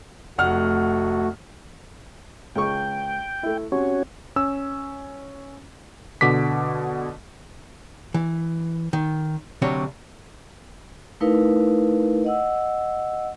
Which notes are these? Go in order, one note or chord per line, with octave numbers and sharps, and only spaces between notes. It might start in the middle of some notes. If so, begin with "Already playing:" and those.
F1 A3 F#4 F#5 F6
C#2 G#3 G5 C#6
A3 E4
C3 C#4 F#4 C#5
C#4 E6
B2 D3 D6 B6
E3
D#3
D2 C3 F#3 D4 C#5
A3 D#4 E4 A#4 B4 F5
D#5 F#5 E6